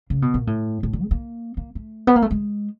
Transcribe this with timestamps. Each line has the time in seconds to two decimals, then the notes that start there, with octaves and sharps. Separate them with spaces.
0.10 C#3
0.22 B2
0.34 A#2
0.47 A2
0.83 A2
0.93 D3
1.02 G#3
1.11 A#3
1.57 A#3
1.75 A3
2.07 B3
2.16 A#3
2.22 A3
2.31 G#3